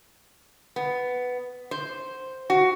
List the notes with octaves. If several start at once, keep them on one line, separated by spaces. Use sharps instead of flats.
B3
C5
F#4